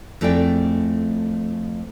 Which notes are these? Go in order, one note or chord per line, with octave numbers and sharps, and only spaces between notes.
F2 A3 E4 G#4 D5 G5